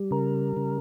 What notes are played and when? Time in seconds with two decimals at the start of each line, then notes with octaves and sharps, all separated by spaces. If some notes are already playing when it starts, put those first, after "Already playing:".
Already playing: G3
0.11 C#3 A#4
0.57 C#3